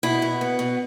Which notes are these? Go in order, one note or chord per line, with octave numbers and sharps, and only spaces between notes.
B2 E4
B2
B3
B2